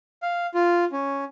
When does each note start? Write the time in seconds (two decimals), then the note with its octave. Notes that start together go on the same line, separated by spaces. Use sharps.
0.22 F5
0.54 F4
0.92 C#4